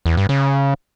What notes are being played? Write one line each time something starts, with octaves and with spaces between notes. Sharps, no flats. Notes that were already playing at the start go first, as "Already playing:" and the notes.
E2
G2
C#3